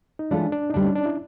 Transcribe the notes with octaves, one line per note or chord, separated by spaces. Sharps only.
D#4
E3 G#3 C#4 D4 F4 A4
D4
D#4
D2 D3 G3 D4
C#4
D4
E4